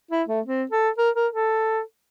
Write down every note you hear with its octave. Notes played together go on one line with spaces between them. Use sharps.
E4
A3
C4
A4
A#4
A#4
A4